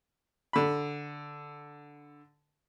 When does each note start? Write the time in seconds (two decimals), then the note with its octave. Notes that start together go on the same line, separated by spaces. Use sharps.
0.53 D3 B5